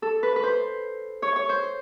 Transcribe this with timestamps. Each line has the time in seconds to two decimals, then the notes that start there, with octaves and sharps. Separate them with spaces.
0.02 A4
0.23 B4
0.36 B4
0.43 C5
1.22 C#5
1.36 C#5
1.49 C5